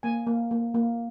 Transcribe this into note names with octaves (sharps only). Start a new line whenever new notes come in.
A#3 G#5
A#3
A#3
A#3